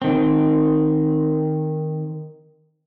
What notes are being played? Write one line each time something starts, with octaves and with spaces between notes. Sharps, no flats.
D#3 C4